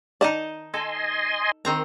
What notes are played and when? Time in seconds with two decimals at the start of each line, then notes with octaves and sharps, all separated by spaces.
0.21 D#3 D#4 D5 D#5 A5
0.74 A4 D#5 G#5 C6
1.65 D#3 C4 A#5